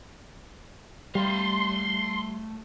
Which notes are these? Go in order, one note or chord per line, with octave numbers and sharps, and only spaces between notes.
G3 A3 F5 C6